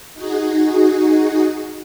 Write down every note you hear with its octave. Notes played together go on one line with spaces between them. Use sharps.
D#4 F#4 G#4